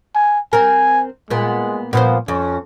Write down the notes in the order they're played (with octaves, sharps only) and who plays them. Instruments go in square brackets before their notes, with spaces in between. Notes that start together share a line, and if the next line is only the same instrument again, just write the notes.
[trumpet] G#5
[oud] C4 A#4 [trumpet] G#5
[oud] A#2 B3 [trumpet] G#3
[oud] A#2 F3 C5 [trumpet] B3
[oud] F2 [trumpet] C#4